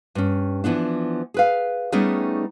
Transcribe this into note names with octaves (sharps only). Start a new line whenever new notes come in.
G2 C#4
E3 F3 B3 D4
G#4 B4 F5
G3 A3 B3 C#4 D#4 G#4